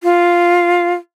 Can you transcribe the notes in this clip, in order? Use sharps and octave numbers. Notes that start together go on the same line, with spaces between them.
F4